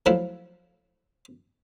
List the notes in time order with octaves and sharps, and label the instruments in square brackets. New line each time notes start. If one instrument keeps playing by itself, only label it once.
[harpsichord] F3 F#3 A3 E4